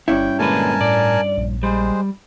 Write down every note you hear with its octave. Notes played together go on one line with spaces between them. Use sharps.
G1 G2 C#4 E4 G5
A#2 D3 G#3 A#4 B4 G#5 A5
A2 D5
A#1
G3 G#3 C5